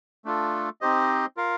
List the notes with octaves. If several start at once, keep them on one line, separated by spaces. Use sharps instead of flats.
A3 D4 F4 A4
C4 D#4 G4 C5 D#5
F4 A#4 F5